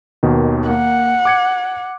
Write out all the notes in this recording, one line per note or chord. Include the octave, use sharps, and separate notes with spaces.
D#2 B2 D#3
A#3 F#5
D6 G#6 C#7